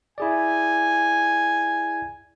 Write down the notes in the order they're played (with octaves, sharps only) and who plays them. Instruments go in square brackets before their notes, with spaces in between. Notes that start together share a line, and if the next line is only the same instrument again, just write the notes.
[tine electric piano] E4 G#4 D5 [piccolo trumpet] G#5